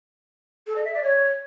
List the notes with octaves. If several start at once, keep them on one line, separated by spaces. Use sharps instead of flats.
A4
D#5
E5
D5
C#5